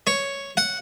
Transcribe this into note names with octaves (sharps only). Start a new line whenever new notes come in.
C#5
F#5